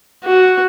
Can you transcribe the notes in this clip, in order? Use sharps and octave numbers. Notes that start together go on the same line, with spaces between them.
F#4